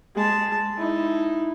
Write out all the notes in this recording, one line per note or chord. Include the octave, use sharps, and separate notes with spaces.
G#3 A5
D#4 E4